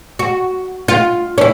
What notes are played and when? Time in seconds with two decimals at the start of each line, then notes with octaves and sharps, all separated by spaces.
0.19 F#4
0.88 F4
1.38 C#4 E4